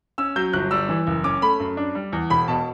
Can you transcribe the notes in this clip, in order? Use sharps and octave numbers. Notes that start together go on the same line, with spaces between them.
C#4 E6
F#3 G6
G1 F#6
G3 E6
E3
F#1
C#4 D6
A3 B5
F#2
D4
G3
E2
E1 B5
B2 A5